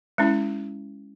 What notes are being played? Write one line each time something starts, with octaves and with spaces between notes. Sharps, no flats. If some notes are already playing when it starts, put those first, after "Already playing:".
G#3 C#4 E4